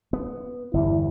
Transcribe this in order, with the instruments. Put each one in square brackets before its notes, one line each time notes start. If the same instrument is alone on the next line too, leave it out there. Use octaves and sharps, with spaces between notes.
[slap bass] B3
[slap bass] G1 E2 G2 [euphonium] E4